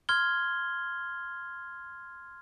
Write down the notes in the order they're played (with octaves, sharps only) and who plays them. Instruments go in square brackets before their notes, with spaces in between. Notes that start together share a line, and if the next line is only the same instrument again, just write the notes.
[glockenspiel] C6 F6 G#6 G7